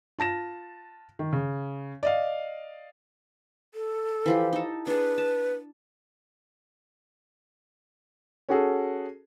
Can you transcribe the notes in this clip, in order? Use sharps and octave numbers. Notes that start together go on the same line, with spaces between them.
F4 A5 A#6 E7
D#3
C#3
D5 D#5 F5
A4
E3 F3 G4
D#4 A4
D4 G#4 B4
A5
C#4 F#4 G#4 A4